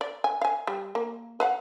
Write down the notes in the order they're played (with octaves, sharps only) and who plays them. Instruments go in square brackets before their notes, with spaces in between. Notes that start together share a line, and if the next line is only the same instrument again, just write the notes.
[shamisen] D5
G#5
F5 G#5
G3
A#3
B4 F5 F#5